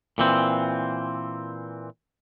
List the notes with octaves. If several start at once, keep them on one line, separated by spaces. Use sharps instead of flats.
A#2 E3 C4